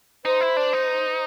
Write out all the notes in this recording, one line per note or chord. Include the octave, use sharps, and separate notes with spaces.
D#4 C5
E4
D4
D#4